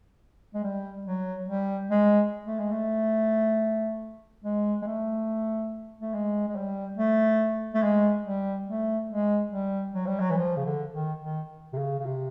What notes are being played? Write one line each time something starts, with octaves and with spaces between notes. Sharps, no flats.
G#3
G3
F#3
G3
G#3
A3
G#3
A3
G#3
G#3
A3
A3
G#3
G#3
G3
A3
A3
G#3
G3
A3
G#3
G3
F#3
G3
F#3
E3
F3
C#3
D3
D#3
D#3
C3
C#3
C#3
C3